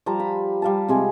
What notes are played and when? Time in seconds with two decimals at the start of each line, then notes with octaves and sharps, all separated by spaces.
0.06 F3 G3 A5 A#5
0.20 B5
0.62 G3 F5 A5
0.89 C3 G#3 G#4